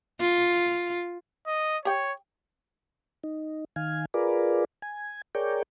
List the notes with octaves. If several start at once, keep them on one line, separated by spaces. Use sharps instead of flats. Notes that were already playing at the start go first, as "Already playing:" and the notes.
F4
D#5
G4 C#5 G5
D#4
D#3 F5 G#5
F4 G#4 A#4 B4 D5
G#5
G#4 A#4 C#5 D5 G5